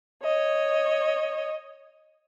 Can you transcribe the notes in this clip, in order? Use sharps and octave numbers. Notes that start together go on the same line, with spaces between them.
C#5 D#5